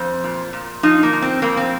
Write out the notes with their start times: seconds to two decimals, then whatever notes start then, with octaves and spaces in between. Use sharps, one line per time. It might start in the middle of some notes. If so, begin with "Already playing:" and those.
Already playing: F2 C5
0.24 A#2
0.53 A#2
0.83 F3 D#4
1.03 A#3
1.13 F3
1.22 C4
1.42 F2 A#3
1.57 C4